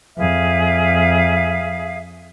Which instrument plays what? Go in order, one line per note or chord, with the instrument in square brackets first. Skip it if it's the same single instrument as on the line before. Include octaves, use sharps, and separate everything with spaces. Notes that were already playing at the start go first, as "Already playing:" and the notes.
[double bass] F2 [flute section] G#4 E5 F5